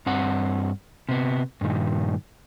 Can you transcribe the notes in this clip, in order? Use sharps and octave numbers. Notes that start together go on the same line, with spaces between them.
G2 C4 F#5
C3 B3
G2 A#2 D#3